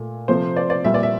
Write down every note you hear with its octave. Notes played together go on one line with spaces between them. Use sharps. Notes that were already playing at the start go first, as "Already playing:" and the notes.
Already playing: A#2 A3
C3 F3 A3 C5
D5
D5
A#2 G3 A#3 E5
D5
E5